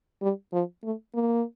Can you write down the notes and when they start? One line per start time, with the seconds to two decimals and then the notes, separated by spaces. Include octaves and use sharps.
0.22 G3
0.53 F3
0.84 A3
1.15 A#3